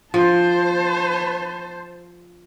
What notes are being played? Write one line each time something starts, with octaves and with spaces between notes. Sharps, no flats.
F3 C5 A5